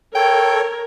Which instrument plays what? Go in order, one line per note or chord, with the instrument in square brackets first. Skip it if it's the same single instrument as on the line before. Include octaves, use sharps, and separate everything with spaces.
[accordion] A4 C#5 [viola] A#4 [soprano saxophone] G5